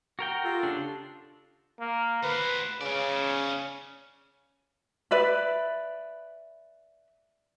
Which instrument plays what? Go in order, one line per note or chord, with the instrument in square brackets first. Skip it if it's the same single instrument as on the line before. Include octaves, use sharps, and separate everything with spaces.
[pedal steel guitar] F#4 A#4 G5
[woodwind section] F4 G4 A4
[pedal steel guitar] C#3 D4
[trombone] A#3
[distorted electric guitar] F#4 C5 [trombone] B4
[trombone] C#3 [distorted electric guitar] C#4 D5
[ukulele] B4 D5 E5 B5